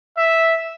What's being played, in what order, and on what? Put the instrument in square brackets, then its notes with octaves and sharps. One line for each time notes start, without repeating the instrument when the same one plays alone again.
[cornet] E5